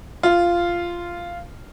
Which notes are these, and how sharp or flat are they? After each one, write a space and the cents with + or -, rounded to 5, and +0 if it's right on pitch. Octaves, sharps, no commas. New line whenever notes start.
F4 -10